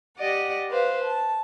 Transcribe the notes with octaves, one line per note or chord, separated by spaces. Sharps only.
G4 D5 D#5 F#5
B4 C5 F5
A5